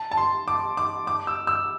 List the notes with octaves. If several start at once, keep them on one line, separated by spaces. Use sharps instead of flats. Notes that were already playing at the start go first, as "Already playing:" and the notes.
Already playing: A5
A5
C6
D6
D6
D6
E6
E6